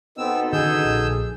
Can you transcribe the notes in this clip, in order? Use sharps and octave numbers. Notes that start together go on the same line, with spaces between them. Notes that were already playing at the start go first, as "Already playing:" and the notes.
B2 B3 C4 D#4 A4 E6
D3 D#3 C#4 G#4 E6 G6
A#1